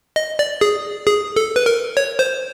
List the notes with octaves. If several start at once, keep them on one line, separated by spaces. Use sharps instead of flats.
D#5
D5
G#4
G#4
A4
B4
A#4
C#5
C5